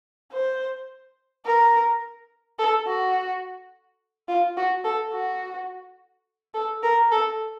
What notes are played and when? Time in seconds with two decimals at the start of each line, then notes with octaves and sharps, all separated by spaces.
0.32 C5
1.45 A#4
2.59 A4
2.87 F#4
4.29 F4
4.57 F#4
4.85 A4
5.14 F#4
6.55 A4
6.83 A#4
7.12 A4